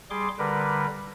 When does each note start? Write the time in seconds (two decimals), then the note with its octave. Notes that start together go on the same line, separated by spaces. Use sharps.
0.10 G3 G#4 C6 D6
0.39 D3 G3 A#4 B4